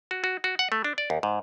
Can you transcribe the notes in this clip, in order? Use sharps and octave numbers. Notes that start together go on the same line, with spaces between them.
F#4
F#4
F#4
F#5
A3
D4
D5
D#2
G#2